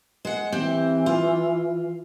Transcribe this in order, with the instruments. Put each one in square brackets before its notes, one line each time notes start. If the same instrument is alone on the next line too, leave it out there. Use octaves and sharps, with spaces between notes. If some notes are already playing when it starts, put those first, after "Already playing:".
[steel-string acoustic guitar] G#3 F#5
[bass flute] E3 [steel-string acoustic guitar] C4 G4
[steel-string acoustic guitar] F4